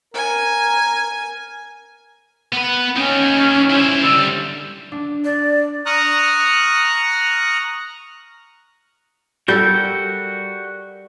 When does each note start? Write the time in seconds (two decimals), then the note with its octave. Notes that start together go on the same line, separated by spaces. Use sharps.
0.14 A#4 G#5
2.53 B3 B4
2.96 C#4 D#4 G4
3.70 E4 C5
4.03 D3 G3 E6
4.92 D4
5.24 D5
5.86 A#5 C#6 D#6 F6 F#6
9.48 G3 F#4 A4 A#4 G6